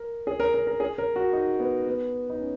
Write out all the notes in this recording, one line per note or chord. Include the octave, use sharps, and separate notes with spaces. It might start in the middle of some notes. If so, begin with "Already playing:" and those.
Already playing: A#4
G#4
A#4
A#4
A#4
G#4
A#4
F#4
D#4
B3
B3
D#4
C#4